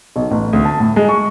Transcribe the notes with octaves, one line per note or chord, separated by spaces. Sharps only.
B1
A1
D2
A5
A2
G#3
C#6